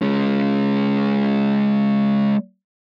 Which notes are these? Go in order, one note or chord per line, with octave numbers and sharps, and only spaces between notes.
G#3 C#4